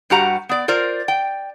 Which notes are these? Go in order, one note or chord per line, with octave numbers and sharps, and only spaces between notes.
G2 G3 F#4 G4 F#5 A#5
B3 D5
F4 A#4 C5 D5
G5